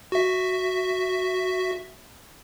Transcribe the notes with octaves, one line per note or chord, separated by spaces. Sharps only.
F#4 E5